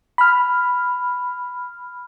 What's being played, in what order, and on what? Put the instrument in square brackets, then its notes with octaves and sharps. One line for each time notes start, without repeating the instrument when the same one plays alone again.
[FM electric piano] B5 F6